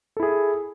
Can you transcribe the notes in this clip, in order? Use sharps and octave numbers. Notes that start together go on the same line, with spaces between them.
E4 G#4 A4